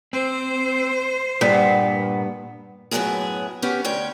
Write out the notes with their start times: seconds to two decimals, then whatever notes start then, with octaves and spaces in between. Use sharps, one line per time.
0.13 C4 C5
1.41 G2 A#2 B3
2.91 F#2 A2 F#3 B3 E4 G#4
3.62 B3 C#4 G4
3.85 D2 C#5 G5